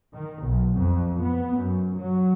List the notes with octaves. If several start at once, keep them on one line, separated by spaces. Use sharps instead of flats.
D#3
B1
F2
B3
F#2
F#3